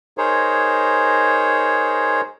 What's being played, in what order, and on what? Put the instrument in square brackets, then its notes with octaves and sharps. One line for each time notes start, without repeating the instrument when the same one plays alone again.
[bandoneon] D#4 G#4 A#4 C5 C#5